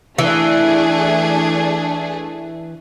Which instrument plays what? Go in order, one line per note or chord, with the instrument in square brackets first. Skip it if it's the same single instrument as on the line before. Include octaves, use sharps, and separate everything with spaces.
[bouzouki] E3 [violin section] A3 D4 G#4